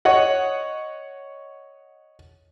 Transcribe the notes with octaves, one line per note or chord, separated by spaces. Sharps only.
C#5 D#5 F#5